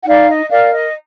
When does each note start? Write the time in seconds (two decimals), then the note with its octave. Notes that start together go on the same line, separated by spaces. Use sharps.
0.02 F#5
0.06 D#4 D5 F5
0.29 D#5
0.50 A#4 D5 F5
0.72 D#5